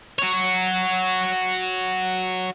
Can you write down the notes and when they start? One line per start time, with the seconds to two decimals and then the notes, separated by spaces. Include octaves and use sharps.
0.19 F#4 C#5